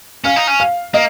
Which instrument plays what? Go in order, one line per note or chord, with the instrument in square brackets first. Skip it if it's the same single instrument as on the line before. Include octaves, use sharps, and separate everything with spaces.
[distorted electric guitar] C#4 [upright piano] F5
[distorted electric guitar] D#4
C#4
[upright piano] F5
[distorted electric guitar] A#3 [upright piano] D#5